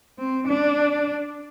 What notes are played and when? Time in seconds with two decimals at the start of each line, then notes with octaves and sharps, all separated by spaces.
0.19 C4
0.48 D4